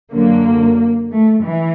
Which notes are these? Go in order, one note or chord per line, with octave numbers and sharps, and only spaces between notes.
F#2 D3 F#3 A#3
A3
E3